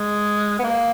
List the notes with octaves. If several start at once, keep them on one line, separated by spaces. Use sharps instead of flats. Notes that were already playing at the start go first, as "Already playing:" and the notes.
Already playing: G#3
B3
A#3